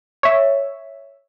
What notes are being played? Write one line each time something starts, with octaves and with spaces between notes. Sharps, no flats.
C#5 E5